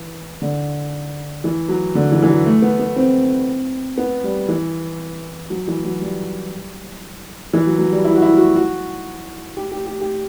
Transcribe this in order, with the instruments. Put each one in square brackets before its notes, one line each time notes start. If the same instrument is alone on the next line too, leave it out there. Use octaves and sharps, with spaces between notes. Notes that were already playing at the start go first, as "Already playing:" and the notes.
Already playing: [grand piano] E3
D3
E3
F#3
D3
E3
E3
F#3
A3
B3
B3
C4
B3
G3
E3
F#3
E3
F#3
G3
E3
F#3
F#3
G3
E4
F#4
E4
F#4
F#4
G4
G4
G4
G4